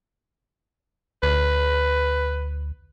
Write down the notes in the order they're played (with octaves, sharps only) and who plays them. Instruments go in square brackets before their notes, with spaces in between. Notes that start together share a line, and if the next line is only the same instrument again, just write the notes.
[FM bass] D2 [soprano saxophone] B4